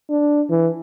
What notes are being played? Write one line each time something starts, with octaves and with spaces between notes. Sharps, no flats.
D4
E3